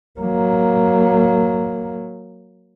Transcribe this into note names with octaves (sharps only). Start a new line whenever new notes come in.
F#3 A#3